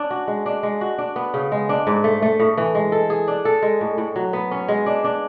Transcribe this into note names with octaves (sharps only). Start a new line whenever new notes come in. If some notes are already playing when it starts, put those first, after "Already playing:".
Already playing: C#4 D4
F#4
G#3
D4
G#3
F#4
D4
B3
C#3
G#3
D4
G#2
A3
A3
A2
E3
G#3
A4
G#4
D4
A4
G#3
A2
A2
F#3
B3
C#4
G#3
D4
D4